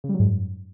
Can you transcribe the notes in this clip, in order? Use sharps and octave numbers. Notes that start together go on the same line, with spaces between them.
C#3
G3
F#3
G#2
F#2